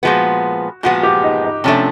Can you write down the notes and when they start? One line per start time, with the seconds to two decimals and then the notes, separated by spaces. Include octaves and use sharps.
0.03 A#2 F3 G#3 B3 F#4
0.83 A#2 F3 G#3 B3 F#4
1.03 G4
1.24 D#4
1.44 D#4
1.64 C3 F3 A3 C#4 D4